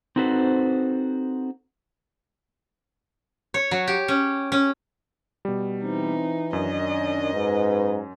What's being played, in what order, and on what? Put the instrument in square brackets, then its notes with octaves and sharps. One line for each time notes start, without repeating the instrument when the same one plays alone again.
[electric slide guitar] C4 D#4 F#4 A4 B4 C5
[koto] C#5
F#3
G4
C#4
C#4
[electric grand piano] B2 G3
[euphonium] E3 [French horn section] C4 [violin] D#4
[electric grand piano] F#2 [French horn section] D#3 C#4 D4 [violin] D#5
[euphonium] G#2 [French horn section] B4